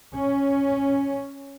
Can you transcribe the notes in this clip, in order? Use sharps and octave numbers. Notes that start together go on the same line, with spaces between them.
C#4